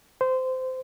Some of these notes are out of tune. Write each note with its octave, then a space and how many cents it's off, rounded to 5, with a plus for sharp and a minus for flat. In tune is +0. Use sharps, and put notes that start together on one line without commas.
C5 -20